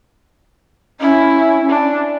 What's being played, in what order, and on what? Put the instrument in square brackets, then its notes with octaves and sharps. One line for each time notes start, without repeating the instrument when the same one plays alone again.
[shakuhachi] C#4 [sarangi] E4
[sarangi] D4